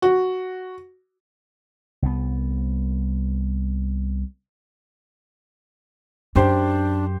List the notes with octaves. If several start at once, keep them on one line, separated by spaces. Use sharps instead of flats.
F#4
C2 B3
F#2 D4 G4 C5